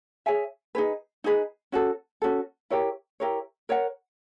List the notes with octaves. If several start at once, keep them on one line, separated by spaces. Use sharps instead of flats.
G#4 C#5 E5 G#5
D#4 G#4 B4
D#4 G#4 B4
C#4 F#4 A4
C#4 F#4 A4
E4 G4 A#4 C#5
E4 G4 A#4 C#5
A#4 C#5 F#5